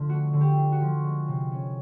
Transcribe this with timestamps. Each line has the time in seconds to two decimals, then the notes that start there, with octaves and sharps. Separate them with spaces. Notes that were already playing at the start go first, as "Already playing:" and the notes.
Already playing: D3 F3 D4
0.09 A3 F#4
0.33 D3
0.41 G4
0.57 D4
0.72 F#4
0.81 F3
1.04 G#3
1.28 C3
1.52 C#4